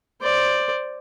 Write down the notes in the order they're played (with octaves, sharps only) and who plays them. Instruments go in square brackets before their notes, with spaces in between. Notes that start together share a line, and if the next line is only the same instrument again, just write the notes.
[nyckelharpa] C5 D5